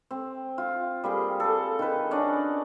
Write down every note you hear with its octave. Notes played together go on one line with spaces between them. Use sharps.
C4
F4
G3 A#3 G#4
A4 G#5
D#3 B4
C#4 D4 D5 D#5